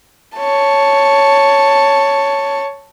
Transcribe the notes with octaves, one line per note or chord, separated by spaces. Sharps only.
C#5 A5